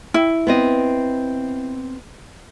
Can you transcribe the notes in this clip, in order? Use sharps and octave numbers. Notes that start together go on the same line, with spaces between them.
E4
B3 C4 D#5